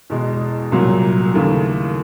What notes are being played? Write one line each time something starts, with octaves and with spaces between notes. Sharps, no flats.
E2 B2 G#3
C2 A#2 F#3
D#2 C#3 E3 A3